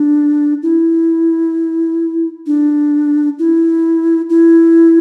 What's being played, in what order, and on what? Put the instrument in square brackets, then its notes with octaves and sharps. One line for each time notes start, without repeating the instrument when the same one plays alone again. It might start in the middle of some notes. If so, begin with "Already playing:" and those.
Already playing: [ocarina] D4
E4
D4
E4
E4